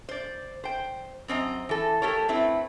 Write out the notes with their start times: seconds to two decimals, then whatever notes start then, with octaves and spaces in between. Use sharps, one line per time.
0.09 C5 D5
0.64 C5 G5
1.28 F#2 C4 D#5 A#5
1.69 E3 A4
2.02 A3 G4 A4 A#4 C#5
2.28 A3 C4 E4 B4